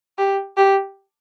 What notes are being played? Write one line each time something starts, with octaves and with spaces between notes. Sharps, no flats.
G4
G4